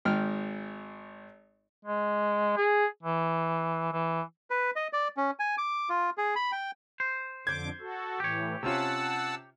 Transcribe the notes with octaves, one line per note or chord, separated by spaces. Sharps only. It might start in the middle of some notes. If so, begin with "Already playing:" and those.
G#1 G#2 G5 F6
G#3
G#4
E3
E3
B4
D#5
D5
C#4
G#5
D6
F4
G#4
B5
G5
C5
F2 D3 D6 G6 G#6
F#4 A4
A2 E3 G4 C#5
C3 C#4 F4 F#5 A5 E6